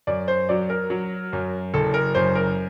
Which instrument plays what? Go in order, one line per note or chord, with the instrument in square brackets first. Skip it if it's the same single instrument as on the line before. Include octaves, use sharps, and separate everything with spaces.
[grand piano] F#2 D5
C5
F#3 D5
A#4
F#3
F#2
F#1 A4
A#4
F#2 C5
A#4